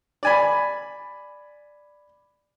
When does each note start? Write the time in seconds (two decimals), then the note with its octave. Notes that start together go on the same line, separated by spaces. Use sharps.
0.23 D5 G#5 B5